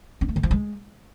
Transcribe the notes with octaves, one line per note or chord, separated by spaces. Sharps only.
C#4
A3
D#3
F3
G#3